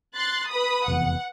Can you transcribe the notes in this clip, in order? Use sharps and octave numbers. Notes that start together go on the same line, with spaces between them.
C6 F#6 A6
B4 B5 D#6
F1 E2 F#5